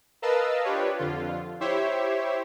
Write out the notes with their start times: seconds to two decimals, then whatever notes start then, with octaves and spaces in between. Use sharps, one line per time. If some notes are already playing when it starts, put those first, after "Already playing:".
0.22 A#4 B4 D#5 F5 A5 E6
0.64 D4 F4 G4 B4 C#5
0.98 F2 D3 F4
1.60 E4 G4 C5 C#5 E5